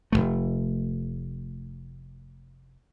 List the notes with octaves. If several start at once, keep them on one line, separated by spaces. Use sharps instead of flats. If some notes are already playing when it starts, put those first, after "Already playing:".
F1 E2 A3